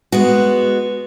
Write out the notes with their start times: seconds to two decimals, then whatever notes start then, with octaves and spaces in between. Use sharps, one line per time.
0.12 G#3 B3 F#4